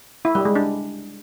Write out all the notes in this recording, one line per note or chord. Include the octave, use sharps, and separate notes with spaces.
E4
G3
G#3
D4